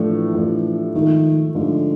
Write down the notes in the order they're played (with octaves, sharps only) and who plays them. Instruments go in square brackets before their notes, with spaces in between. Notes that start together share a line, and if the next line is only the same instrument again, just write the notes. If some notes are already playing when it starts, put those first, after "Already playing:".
Already playing: [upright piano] A2 F3 A3 D4 [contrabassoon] E3
[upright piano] A2 F3 A3 D4
[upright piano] G#2 F3 A3 [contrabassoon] D#3
[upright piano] G#2 F3 A3 [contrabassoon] D3